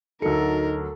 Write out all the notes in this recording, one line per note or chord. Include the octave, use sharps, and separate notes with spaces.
D2 F#3 D#4 A4 A#4 C#7